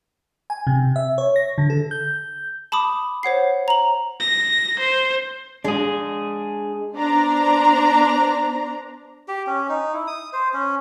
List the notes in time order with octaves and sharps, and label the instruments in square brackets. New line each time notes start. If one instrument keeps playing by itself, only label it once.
[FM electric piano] G#5
C3
E5
C#5
A#6
D3
A4
G6
[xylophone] A5 B5 D6 D#6
C5 C#5 F#5 C7
A#5 F#7
[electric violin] A#6
C5
[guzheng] G#3 [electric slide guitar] D4 G#4
[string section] B3 D4 C5 A#5
[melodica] G4
C#4
D#4
E4
D#6
C5
C#4